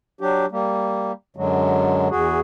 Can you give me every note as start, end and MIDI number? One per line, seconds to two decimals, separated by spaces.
0.21 0.46 54
0.21 0.46 62
0.21 0.46 67
0.51 1.12 55
0.51 1.12 58
1.36 2.08 42
1.36 2.08 50
1.36 2.08 54
1.36 2.08 56
2.10 2.40 40
2.10 2.40 66
2.10 2.40 68